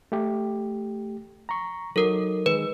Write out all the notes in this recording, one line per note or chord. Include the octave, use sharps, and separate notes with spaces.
A3 G4
A#5 C#6
F#3 D#4 A4 A#4
D#3 G#3 B4